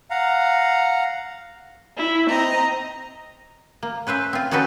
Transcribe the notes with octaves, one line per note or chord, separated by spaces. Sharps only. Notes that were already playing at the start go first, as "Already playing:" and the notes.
F5 F#5 A#5
E4
C4 D#5 A#5
A#3
C#4 B4 C5 E5
C4 F4
C#4 D#4 F#4 A4 B4 C5